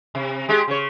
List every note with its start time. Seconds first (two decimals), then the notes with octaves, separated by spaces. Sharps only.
0.15 C3
0.49 G#3 G4 G#4
0.68 C#3 C#5